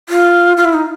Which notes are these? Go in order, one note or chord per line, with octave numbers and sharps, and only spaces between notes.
F4
F4
E4
D#4